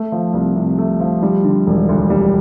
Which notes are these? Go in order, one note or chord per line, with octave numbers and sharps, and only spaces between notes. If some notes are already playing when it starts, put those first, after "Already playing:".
Already playing: A3
F3
C2
C3
A3
F3
G3
D3
E1
D2
G3